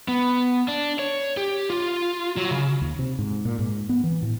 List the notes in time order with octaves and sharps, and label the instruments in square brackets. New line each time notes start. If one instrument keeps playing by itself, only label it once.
[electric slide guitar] B3
D4
C#5
G4
F4
F#3
C#3
[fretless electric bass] D#2
C3
G#2
A#2
G#2
B3
E3
A2